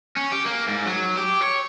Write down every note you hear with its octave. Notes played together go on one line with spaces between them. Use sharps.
C#4
G4
A#3
G#2
F#3
G4
C#5